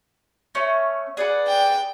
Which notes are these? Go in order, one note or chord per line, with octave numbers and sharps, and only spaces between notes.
A3 C#4
G#4 B4 D5 F#5
G5